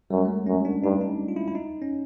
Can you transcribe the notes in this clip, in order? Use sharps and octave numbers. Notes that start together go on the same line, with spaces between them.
F#2 G3
A3
G#3
F#2 C#4
D4
G2 D#4
D#4
F4
E4
E4
D#4
C#4